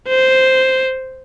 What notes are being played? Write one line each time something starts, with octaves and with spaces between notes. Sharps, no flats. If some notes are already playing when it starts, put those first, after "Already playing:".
C5